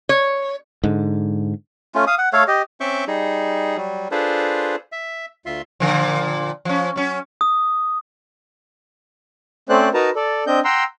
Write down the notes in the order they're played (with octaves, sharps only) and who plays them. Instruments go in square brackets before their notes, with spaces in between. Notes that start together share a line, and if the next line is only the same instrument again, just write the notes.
[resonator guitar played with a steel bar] C#5
[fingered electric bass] G#2 D3
[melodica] A3 C#4 F4
F5 D#6
F#5
A3 A4 C#5 F5
G4 D#5
[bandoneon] C4 C#4 E5 C#6 D6 G6
G3 D#4 G#4
F#3 G3
D4 F4 G#4 A4 B4 C5
E5
D2 F4 E5 C6
[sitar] A#2 D3 F3
F3 C#4
F#3 C#4
[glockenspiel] D#6
[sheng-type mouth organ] A3 C4 C#4 C5 D5 F#6
D#4 F#4 A#4 B4 A5 A#5
A4 D5
C4 D4 D#5 G6
F#5 G5 A#5 C6 E6